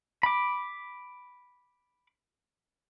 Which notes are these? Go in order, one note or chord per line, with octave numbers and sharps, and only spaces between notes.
B5 D6